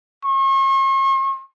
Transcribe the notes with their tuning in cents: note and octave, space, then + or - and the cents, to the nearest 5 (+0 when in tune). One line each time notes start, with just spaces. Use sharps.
C#6 -45